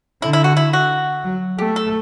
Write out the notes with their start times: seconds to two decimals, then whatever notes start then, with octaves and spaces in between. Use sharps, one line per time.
0.22 D3 E4
0.33 E4
0.44 F#4
0.57 E4
0.73 F#4
1.24 F#3
1.58 A3 G4
1.76 A4